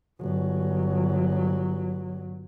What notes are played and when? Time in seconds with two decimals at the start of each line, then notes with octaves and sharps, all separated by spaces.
0.21 G1 F#3